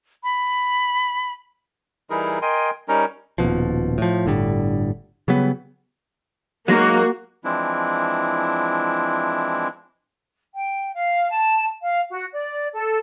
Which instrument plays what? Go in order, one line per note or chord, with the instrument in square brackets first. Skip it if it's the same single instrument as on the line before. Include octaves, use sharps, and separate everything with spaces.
[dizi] B5
[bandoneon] E3 G3 D#4 E4 G#4 A#4
A#4 D#5 G5 G#5 C6
G3 C#4 D#4 A#4
[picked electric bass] D#1 G#1 B2 F3
A2 F3
G1 A2 D3 G3
C#3 F#3 G3 B3
[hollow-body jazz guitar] F#3 G#3 D#4 [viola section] A#3 F#4
[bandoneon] E3 F3 G#3 C4 D4 E4
[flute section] G5
F5
A5
F5
F#4
D5
A4